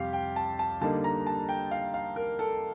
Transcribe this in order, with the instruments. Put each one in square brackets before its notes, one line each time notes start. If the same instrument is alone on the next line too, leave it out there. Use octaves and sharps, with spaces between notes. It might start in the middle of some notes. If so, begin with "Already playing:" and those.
Already playing: [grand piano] F2 C3 G3 G4 F5
G5
A5
A5
D3 G3 A#3 D#4 A5
A#5
A5
G5
F5
F5
A#4
A4